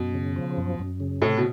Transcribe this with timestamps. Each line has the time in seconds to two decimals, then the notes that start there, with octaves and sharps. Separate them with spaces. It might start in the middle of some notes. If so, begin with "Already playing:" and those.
Already playing: F#2 B2
0.15 C#3
0.36 F3
0.57 F#2
0.79 F#2
1.00 C#3
1.21 A2 C3
1.37 B2